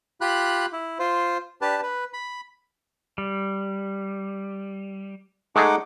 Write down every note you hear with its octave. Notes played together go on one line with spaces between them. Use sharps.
F4 G4 B5 F#6
E4
F4 C5
D4 G4 B4 A5
B4
B5
G3
G#3 A3 D#4 G#4 F#5 D6